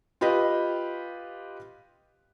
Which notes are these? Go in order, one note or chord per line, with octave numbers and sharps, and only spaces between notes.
F4 G4 B4 D#5